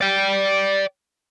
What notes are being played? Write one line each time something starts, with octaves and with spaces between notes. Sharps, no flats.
D5 G5